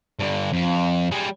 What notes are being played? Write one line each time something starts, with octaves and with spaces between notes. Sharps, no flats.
G2 D3
F2
G3 G#4